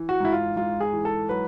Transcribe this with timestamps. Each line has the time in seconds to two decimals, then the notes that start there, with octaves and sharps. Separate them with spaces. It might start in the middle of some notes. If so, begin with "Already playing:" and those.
Already playing: E3
0.09 F#4
0.20 G#2 E4
0.32 F4
0.56 G#2 F4
0.81 G#4
0.93 E3
1.05 A4
1.29 F#3 B4